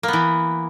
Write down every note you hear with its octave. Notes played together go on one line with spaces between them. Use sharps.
E3 A#3 B3